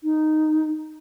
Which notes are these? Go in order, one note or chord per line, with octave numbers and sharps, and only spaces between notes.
D#4